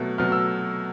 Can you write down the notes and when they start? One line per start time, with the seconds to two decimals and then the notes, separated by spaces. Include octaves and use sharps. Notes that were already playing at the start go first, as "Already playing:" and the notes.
Already playing: B2 F#3 A3 F#6
0.18 B2 F#3 A3 F6
0.32 E6